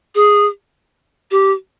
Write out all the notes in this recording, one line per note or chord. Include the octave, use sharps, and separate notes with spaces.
G#4
G4